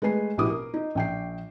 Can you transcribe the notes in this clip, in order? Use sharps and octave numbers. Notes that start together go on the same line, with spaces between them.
G#3 A3 B4 G#5 C7
A#1 B2 E4 G4 D6 D#6
A#4
D#4
A#1 G5 C7